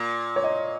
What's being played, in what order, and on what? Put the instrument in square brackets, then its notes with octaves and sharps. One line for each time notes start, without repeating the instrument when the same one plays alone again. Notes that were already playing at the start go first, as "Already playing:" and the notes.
Already playing: [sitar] A#2
[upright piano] C#5
D#5